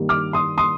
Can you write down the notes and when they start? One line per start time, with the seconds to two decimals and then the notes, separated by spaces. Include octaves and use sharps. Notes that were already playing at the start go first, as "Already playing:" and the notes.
Already playing: G2 D#3 G3 A#3
0.09 D6 F6
0.33 C6 D#6
0.58 C6 D#6